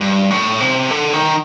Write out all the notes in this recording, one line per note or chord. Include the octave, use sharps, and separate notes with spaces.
G2
A2
C3
D3
D#3